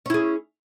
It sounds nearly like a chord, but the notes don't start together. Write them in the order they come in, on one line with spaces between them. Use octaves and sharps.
C#4 E4 G#4